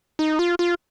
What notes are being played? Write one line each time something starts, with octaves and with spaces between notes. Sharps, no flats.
D#4
F4
F4